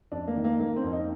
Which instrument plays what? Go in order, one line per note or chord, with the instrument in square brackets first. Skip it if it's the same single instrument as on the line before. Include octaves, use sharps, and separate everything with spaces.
[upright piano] F2 D4
A#3
D#3
A#3
D#3 A#3
C4
F2
D#4